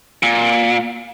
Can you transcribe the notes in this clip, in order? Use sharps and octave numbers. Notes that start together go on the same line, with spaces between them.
A#2